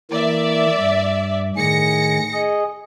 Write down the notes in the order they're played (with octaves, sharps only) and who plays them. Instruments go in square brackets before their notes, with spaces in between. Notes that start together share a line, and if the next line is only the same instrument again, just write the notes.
[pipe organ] E3 A#3 [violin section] D5 E5
[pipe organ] G2
[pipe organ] A2 D#3 G#4 [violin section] A#6 C#7
[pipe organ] G#4 D#5